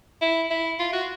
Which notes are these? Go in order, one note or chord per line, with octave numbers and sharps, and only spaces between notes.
E4
E4
F4
F#4